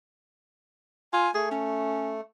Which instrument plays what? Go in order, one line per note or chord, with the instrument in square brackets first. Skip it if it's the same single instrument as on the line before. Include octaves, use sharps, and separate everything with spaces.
[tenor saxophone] F4 [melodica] G#5
[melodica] A3 [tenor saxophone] G#4
[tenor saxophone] C#4